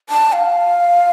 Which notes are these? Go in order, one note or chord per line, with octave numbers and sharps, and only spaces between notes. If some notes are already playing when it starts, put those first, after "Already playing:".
A5
F5